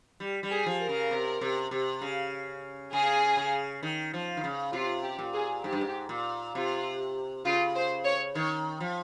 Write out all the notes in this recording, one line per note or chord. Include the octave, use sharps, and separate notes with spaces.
G3
G3
G#4
F3
A#4
C#3
C3
C3
C3
C#3
C#3 G#4
C#3
D#3
F3
D#3
C#3
C3 F4
G4
A#2
G#4
G#2 G4
G2
G#2
A#2
C3 F4
C#3 F4
C5
C#5
D#3 C#5
F3